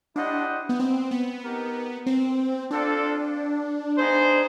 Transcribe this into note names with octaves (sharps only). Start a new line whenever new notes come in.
D4 E4 G4 C5 D#5 F#5
B3
C4
B3
D#4 G4 A#4
C4
C4 D4 F4 A4 D5
B3 D#4 G#4 C5